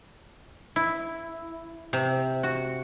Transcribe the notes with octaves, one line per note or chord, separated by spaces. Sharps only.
E4
C3
F#4